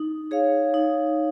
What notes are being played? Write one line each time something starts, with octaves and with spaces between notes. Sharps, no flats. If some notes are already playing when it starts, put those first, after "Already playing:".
Already playing: D#4
G#4 C#5 F5
D#4